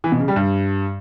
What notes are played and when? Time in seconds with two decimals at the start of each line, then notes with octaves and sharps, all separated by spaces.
0.04 E3
0.12 B2
0.20 C#3
0.28 G3
0.36 G2